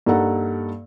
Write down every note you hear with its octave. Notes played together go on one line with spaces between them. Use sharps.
G2 A#3 D#4 A4 F#5 A#5